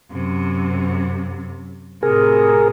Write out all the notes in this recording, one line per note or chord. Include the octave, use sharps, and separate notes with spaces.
F#2 C3
A2 C3 G#4 A#4